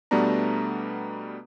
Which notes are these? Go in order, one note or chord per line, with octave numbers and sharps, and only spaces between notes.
B2 G3 A3 B3 D4 A#5